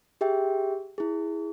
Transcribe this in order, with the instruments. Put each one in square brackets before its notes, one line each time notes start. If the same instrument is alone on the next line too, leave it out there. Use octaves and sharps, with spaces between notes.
[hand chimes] G4 G#4 E5 G5
E4 G#4